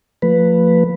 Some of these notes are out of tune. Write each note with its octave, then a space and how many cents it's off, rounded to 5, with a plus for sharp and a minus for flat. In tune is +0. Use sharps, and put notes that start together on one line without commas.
F3 +0 A3 +40 B4 +0